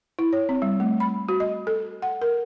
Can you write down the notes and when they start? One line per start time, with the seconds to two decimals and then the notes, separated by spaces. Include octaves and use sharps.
0.19 E4
0.33 C#5
0.49 C4
0.62 G3
0.80 A3
1.00 B5
1.29 F#4
1.40 D#5
1.67 A4
2.02 F#5
2.22 A#4